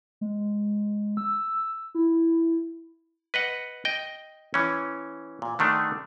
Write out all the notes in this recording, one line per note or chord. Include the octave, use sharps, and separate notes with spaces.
G#3
E6
E4
B4 D#5 F#5
D#5 G5
E3 C#4
A#2
D3 D#3 A3 D4